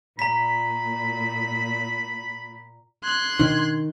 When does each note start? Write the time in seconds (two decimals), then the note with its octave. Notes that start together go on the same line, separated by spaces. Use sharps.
0.19 A#2 A#5 B5 B6
3.04 C6 F#6 G#6
3.39 B2 D#3 D4